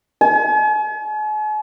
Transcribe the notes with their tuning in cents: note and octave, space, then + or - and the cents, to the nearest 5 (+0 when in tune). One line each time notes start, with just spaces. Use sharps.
G#5 +45